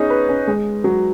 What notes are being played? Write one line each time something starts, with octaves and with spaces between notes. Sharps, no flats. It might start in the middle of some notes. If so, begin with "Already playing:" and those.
Already playing: B3 C#4 D#4 G#4
B4
C#4
G#3
F#3